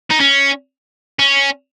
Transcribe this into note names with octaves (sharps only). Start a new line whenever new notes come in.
D#4
C#4
C#4